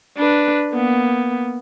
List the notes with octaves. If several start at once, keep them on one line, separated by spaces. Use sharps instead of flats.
D4 B4
A#3 B3